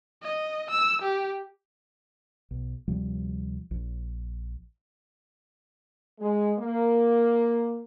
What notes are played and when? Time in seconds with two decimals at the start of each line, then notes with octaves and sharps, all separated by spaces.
0.23 D#5
0.71 E6
1.02 G4
2.51 B1
2.88 D2 C3 F3 G3
3.71 A#1
6.19 G#3
6.59 A#3